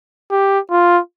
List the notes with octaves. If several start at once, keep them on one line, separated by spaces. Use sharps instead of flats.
G4
F4